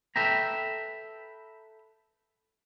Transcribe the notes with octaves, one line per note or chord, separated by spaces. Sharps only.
A4 B4 E5 G5 A#5